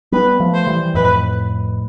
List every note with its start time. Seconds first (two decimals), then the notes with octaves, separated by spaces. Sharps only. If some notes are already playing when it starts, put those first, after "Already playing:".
0.12 G3 B3 B4
0.40 F3 A3
0.54 C5
0.67 E3 G3
0.94 F2 A2 B4